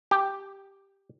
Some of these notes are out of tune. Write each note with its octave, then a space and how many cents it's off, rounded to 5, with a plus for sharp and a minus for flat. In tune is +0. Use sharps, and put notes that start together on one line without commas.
G4 +0